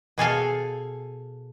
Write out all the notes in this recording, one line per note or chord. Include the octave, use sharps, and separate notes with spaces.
B2 G#4 A4 F5